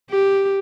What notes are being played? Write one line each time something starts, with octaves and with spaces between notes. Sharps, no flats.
G4